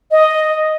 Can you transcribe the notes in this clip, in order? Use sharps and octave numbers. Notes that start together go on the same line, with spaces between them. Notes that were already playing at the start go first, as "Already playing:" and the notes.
D#5